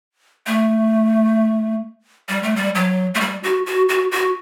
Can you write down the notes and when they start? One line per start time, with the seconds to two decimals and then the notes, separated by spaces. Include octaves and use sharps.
0.46 A3
2.29 G3
2.43 A3
2.56 G3
2.75 F#3
3.14 A3
3.20 G3
3.43 F#4
3.66 F#4
3.89 F#4
4.11 F#4